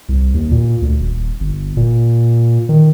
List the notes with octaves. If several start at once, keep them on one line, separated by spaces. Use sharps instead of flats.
C2
D#2
A#2
D2
D#1
G1
A#2
D#3